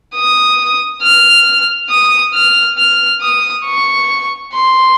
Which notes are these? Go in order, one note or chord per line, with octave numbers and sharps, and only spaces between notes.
D#6
F6
D#6
F6
F6
D#6
C#6
C6